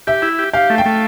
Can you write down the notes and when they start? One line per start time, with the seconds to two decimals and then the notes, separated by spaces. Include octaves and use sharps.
0.07 G4 E5
0.22 E4
0.39 G4
0.53 G4 F5
0.70 A3
0.78 G5
0.86 A3